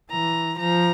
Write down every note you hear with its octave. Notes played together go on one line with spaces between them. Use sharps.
E3 A#5
F3 A#5